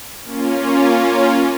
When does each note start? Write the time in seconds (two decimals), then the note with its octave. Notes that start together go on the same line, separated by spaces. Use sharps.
0.23 A#3 C#4 F4